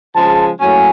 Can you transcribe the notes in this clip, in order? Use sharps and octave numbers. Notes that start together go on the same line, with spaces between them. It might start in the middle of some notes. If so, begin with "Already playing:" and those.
C#3 F3 G#3 A5
A2 F#3 A#3 C#4 G#5